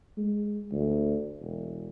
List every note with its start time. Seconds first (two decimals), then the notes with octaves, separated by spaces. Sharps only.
0.17 G#3
0.72 D2
1.41 E1